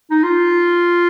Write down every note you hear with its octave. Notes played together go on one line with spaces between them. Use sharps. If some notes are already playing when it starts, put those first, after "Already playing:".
D#4
F4